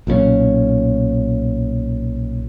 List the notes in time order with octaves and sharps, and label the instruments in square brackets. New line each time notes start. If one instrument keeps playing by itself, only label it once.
[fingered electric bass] B1 A#2 F#3 C#4